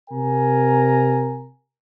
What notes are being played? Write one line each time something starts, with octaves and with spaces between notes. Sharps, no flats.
C3 A#4 G#5 A#5